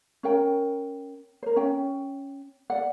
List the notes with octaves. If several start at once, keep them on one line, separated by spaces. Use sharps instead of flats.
C#4 A#4 G5
A#4 C5
C#4 G5
D5 F#5